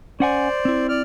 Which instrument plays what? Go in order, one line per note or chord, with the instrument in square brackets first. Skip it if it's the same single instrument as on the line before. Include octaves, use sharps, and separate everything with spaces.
[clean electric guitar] C#4 F#5 G#5 [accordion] C5 D5
[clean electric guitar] C4 E4
[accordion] D5 F6